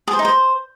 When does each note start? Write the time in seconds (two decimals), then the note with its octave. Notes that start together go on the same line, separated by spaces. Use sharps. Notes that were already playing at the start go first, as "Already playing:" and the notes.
0.08 G#4
0.13 C5
0.19 D#4
0.25 C5